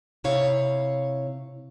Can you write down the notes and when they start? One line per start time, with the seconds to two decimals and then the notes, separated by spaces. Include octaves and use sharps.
0.24 C3 E4 C#5 F5